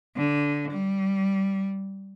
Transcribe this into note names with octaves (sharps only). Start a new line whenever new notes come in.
D3
G3